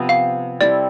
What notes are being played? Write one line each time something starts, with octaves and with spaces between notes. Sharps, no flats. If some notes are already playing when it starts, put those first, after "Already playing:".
Already playing: C3 F3 B3
F5
G3 C4 E4 A4 D5